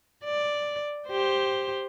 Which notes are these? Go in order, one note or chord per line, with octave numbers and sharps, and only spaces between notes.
D5
G4 C5